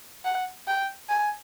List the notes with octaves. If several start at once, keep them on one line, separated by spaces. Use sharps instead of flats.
F#5
G5
G#5